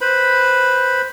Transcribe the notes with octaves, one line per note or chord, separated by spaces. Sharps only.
B4 C5 B5